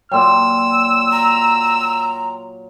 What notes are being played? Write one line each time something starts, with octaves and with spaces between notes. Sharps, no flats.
A#2 F#3 G5 C6 E6
A#5